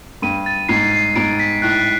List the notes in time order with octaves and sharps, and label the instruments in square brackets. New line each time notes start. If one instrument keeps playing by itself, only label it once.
[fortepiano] G2 [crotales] D#7
[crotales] A6
[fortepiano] G#2 [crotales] C7
[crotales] C7
[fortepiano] G#2 [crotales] D7
[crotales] B6
[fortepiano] A2 [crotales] F#6